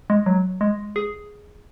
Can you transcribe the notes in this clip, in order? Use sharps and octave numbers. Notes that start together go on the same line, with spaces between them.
G#3
F#3
G#3
G#4